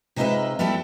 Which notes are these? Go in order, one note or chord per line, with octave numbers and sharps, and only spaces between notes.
C3 G#3 D#4 F4 B4 E5
G3 B3 E4 F#4 G4 A4